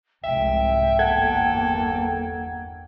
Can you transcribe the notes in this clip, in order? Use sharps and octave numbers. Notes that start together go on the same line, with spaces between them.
F1 C2 G#2 E5 G5
G1 E2 A#3 A4 F#5 G#6